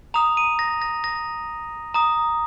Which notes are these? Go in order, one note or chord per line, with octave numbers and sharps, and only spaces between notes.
A#5 D#6 F7
D#7
A#6
A#6
A#6
A#5 D#6